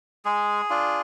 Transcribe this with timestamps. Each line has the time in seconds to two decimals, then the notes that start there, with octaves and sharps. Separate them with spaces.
0.25 G#3 G#4
0.70 D4 F4